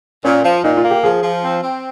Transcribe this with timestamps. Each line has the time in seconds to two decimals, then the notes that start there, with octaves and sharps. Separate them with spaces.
0.24 A#2 C#4
0.44 F3
0.64 A#2 D#4
0.77 F4
0.84 A#3
0.90 G4
1.03 F3 G#4
1.23 F3
1.44 C4
1.63 C4